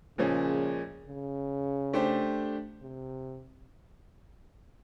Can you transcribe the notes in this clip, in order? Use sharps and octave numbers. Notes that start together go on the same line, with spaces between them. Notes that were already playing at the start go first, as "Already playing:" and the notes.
A#2 C#3 F3 G#3 C#4
C#3
A3 D4 G4 C5
C3